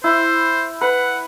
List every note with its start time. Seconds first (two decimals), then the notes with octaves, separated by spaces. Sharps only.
0.04 E4 C5
0.81 B4 F#5